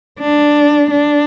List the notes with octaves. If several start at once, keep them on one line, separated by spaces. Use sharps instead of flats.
D4
D4